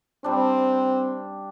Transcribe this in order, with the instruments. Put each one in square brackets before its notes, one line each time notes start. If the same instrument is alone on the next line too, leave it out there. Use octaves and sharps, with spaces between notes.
[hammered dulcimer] G3 D4 [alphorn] C4